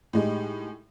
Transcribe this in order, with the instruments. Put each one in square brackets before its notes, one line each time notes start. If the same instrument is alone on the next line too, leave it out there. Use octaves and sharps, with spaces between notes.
[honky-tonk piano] A2 G#3 D#4 G4